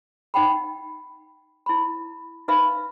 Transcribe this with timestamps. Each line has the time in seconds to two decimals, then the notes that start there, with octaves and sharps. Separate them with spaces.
0.34 D#4 F#5 G5 B5
1.66 E4 B5
2.48 D#4 B4 E5 F5 B5